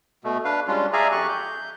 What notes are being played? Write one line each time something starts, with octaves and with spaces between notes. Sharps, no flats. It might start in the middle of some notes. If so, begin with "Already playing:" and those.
B2 A3
D4 B4 F5
G3 G#3 C#4 D4 F4
G#4 D5 E5 F5 G#5 A#5
F2 G4 C#6 F#6
G6